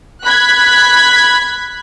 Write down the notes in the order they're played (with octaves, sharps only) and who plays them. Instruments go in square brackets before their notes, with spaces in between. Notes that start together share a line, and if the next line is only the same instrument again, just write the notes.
[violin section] B5 F#6 G#6 B6